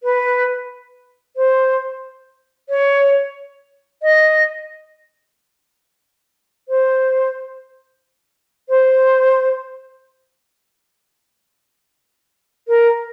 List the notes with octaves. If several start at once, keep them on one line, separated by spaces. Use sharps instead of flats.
B4
C5
C#5
D#5
C5
C5
A#4